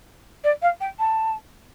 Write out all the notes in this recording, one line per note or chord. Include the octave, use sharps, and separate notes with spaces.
D5
F5
G5
A5